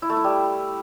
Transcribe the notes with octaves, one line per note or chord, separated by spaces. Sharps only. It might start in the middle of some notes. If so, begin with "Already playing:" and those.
E4
A3
E4
G3